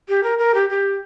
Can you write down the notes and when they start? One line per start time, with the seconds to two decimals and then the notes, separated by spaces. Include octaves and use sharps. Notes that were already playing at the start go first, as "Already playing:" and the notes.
0.08 G4
0.23 A#4
0.39 A#4
0.54 G4
0.70 G4